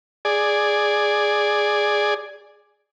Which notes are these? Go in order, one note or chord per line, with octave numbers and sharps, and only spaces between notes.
G#4 D5